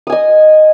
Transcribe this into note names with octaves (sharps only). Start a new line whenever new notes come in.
D#5 G#5 D#6